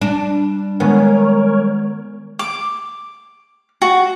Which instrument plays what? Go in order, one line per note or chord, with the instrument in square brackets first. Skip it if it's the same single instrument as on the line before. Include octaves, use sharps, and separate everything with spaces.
[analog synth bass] G3 [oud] D4
[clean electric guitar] D#3 G#3 G#5 [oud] B3 [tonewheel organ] A#4 C#5
[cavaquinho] D6
F#4